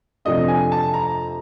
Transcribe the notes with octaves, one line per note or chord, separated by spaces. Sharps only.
F2 C3 F3 A3 D4 D#5
G#5
A5
A#5